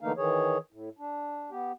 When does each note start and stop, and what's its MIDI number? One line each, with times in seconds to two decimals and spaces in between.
0.01 0.12 50
0.01 0.12 52
0.01 0.12 57
0.01 0.12 58
0.01 0.12 63
0.01 0.12 77
0.17 0.58 51
0.17 0.58 52
0.17 0.58 68
0.17 0.58 73
0.72 0.89 45
0.99 1.50 62
1.51 1.72 59
1.51 1.72 67